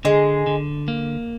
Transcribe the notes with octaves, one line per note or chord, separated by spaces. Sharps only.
D3 G#3
D3
A#3